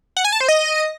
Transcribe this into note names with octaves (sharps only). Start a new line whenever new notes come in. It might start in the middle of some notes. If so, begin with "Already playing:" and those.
F#5
G#5
A5
C5
D#5